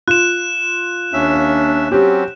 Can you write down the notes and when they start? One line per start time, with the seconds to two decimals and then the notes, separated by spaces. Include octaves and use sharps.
0.08 F4 F#6 E7
1.13 D#2 A#3 C#4 D4 E5
1.92 F#3 C4 C#4 G4